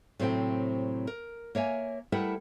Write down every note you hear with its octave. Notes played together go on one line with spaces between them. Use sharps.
A2 C3 F#3 C4 F5 G5
A#4
A#3 C#5 E5 G#5
G3 A3 E4 A#4 B4 F#5